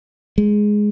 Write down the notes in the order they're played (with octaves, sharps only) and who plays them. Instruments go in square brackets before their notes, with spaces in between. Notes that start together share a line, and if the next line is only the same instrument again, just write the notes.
[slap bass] G#3